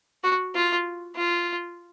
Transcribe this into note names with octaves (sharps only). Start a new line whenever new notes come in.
F#4
F4
F4